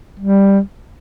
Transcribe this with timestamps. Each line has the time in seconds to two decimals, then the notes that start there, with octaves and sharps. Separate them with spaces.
0.20 G3